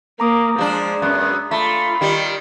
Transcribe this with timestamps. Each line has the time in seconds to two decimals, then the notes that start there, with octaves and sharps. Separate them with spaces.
0.20 A#3 A#5 D6 D#6
0.58 F3 G#3 D4
1.02 F#2 B3
1.51 A3 F4 B5
2.01 D#3 G3